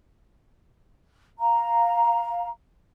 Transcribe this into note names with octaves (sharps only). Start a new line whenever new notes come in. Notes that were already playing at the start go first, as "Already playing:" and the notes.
F5 A#5